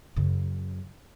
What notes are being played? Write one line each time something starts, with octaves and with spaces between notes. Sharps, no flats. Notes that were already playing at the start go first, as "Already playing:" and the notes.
F#2 C#3